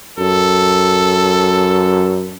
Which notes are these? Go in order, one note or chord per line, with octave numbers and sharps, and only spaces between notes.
F#2 A4